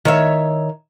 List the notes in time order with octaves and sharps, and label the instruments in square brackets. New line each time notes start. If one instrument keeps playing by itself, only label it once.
[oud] D#3 C#5 E5